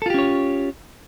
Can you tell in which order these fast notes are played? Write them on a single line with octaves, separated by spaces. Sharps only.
A4 F4 G4 C#4 C#5